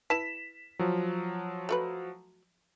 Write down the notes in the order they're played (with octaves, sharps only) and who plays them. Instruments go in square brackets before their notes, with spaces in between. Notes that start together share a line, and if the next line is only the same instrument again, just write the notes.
[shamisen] E4 B4 A5 [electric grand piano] B6 E7
[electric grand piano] F3 F#3
[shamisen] A3 F#4 B4